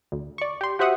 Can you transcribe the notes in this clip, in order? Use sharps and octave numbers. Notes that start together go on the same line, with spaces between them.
D2
D5 C#6
G4 C6
F#4 G4 C5 E5 F#5 D#6